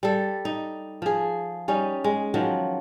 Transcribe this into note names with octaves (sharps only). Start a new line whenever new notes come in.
G3 A4
D#4
F3 G#4
G3 C#4 D#4
G#3
D#3 F3 F#3